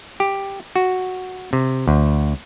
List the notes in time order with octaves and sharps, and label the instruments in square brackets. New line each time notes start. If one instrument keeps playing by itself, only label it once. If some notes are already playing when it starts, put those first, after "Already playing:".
[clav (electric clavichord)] G4
F#4
C3
D2